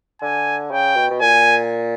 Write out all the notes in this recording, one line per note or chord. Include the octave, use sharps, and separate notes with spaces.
D3 G#5
C#3 G5
B2
B2
A#2 G#5